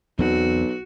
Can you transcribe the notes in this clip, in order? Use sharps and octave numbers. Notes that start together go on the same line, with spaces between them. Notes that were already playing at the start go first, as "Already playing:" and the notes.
B1 E2 C4 F#4